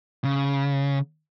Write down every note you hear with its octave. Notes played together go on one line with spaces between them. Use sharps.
C#3